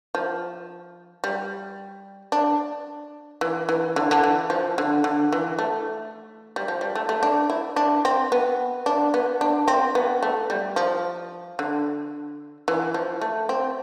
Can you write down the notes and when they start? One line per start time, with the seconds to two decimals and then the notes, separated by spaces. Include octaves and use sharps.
0.15 F3
1.24 G3
2.32 D4
3.41 E3
3.69 E3
3.96 D3
4.11 D3
4.24 E3
4.50 F3
4.78 D3
5.04 D3
5.33 E3
5.59 A3
6.56 G3
6.68 F3
6.81 G3
6.95 A3
7.09 A3
7.23 D4
7.50 E4
7.76 D4
8.05 C4
8.32 B3
8.86 D4
9.14 B3
9.41 D4
9.68 C4
9.95 B3
10.23 A3
10.50 G3
10.76 F3
11.59 D3
12.68 E3
12.94 F3
13.21 A3
13.49 C4